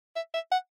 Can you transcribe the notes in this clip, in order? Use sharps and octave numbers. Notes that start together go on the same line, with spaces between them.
E5
E5
F#5